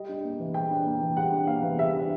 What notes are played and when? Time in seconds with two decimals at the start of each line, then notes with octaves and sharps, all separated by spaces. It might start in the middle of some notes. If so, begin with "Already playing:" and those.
Already playing: G3 D#5
0.09 D4
0.24 A#3
0.40 E3
0.54 G3 G5
0.71 D4
0.85 A#3
1.01 E3
1.17 G3 F#5
1.32 D4
1.47 A#3 F5
1.63 E3
1.79 G3 E5
1.94 D4